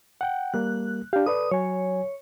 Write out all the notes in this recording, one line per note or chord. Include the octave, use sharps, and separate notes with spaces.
F#5 G5
G3 A#3 F#6
D4 G4 F5
A4 B4 D5 D#6
F#3 C#5 G#5